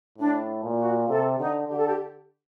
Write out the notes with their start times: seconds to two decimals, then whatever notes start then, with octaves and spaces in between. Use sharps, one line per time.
0.18 A2 D4
0.64 A#2
0.78 F#4
1.08 C3 A4
1.38 D3 D#4
1.68 D3 G4
1.77 A4
1.86 G4